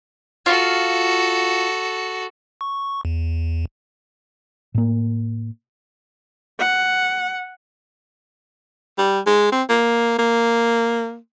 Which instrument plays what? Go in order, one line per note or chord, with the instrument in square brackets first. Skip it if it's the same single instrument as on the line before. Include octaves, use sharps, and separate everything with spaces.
[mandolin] F4 [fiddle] F#4 A4
[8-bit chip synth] C#6
E2
[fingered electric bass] A2 A#3
[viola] F#5
[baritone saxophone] G3
G#3
C4
A#3
A#3